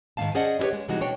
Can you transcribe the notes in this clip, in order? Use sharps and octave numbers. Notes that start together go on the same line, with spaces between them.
G#2 D#3 G#3 B3 F5 A5
C#4 G#4 C5 D5 D#5 F#5
E4 F#4 G4 B4 C#5
G#3
C3 E3 G3 G#3 D#4 F#4
B2 D4 C#5 G5